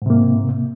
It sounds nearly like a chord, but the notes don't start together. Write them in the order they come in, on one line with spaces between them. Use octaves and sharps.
G#2 C3 A#3